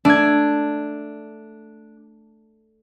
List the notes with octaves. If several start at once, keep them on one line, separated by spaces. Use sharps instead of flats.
A3 D4 G#6